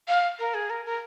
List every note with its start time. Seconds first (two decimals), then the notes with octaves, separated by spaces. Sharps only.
0.08 F5
0.39 A#4
0.54 G#4
0.70 A#4
0.86 A#4